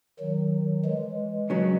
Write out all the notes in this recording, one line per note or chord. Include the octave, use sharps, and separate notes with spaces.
D#3 F#3
E3 G#3
C#3 F#3 C#4